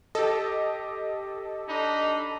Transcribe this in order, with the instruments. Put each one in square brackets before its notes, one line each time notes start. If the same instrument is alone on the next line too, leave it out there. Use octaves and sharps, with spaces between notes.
[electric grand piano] G4 D#5 [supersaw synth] A4
[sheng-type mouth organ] D4 B5 [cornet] D#4